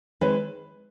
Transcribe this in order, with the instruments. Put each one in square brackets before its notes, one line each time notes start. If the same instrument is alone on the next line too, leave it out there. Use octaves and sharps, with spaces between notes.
[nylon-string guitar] D#3 G#3 C4 D#4 [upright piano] B4